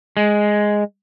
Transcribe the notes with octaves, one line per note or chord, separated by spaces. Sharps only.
G#3